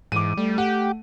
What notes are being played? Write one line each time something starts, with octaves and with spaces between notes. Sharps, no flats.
G#2 E3 D6 D#7
G3 A3
G4 F#5